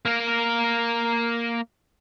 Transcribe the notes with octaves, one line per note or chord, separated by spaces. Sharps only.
A#3 A#4